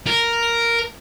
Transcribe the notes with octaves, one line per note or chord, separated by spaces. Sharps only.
A#4